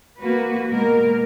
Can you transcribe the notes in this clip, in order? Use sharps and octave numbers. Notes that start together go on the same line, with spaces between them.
A#3 F#4 B4
B2 G#3 A#3 A#4